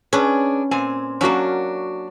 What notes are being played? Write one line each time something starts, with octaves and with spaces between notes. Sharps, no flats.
C#4 D4 G#4 B4
A#2 C4 G#5
F#3 A#3 C#4 D4 F#4